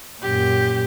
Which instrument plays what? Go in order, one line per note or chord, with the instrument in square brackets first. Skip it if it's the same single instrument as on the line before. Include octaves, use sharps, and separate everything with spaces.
[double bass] F#2 A#2 [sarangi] G4